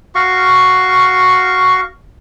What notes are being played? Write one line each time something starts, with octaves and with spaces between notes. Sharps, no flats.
F#4 F5 C#6